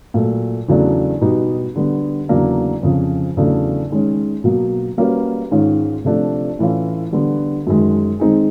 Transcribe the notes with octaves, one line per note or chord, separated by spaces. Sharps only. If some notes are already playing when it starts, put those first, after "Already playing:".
A#2 F#3 A3
E2 C#3 F#3 A3 D4
B2 G3 B3 D#4 G4
D3 G3 B3
E2 C#3 F#3 A#3 D4
F2 C#3 F3
E2 C#3 F#3 A3 D4
D#3 G#3 C#4
B2 F#3 A#3
G3 A#3 C#4 F#4 B4
G#2 D#3 G#3 C#4 F4
C3 F3 A3 D4
A2 E3 A3 C#4 F4
D3 G3 B3
F#2 D#3 G#3
D#3 G#3 C4 D#4 G#4